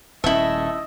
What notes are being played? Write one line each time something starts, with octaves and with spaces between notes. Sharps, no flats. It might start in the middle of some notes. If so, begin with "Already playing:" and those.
D#1 A3 C#4 E4 D#5 E5